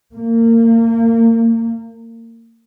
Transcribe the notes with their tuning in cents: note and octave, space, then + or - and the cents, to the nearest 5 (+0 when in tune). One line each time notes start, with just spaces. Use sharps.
A#3 -30